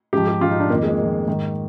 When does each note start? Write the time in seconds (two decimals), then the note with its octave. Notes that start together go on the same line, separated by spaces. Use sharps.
0.13 G#2 F3 G4
0.27 G4
0.41 G#2 F3 F4
0.50 D#4
0.60 D4
0.70 D#3 A#3
0.73 F2
0.83 G#3
0.90 A#3
0.99 F2 D#3
1.28 G#2 D#3